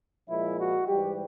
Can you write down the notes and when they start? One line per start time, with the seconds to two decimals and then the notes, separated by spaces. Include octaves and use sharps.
0.29 A#2 F3 G#3 E4
0.58 F#4
0.88 G#2 E3 G3 G4